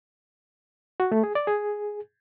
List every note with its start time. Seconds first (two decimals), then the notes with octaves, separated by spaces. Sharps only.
1.00 F#4
1.12 A3
1.23 G#4
1.35 D5
1.47 G#4